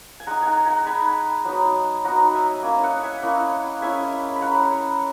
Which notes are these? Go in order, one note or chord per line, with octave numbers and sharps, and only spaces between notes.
G#5
G#3 D#4 F#5 A#5
F#5 G#5 A#5
F#5 A#5
G#3 D#4 G#5 B5
F#3 B3 D#4
F#3 B3 D#4 F#5 A#5
E5 G#5
A#3 C#4 E4 E5 G#5
D#5 F#5
E5 G#5
A#3 C#4 E4 D#5 F#5
G#3 C#4 E4 E5 G#5
B5
G#3 C#4 E4 F#5 A#5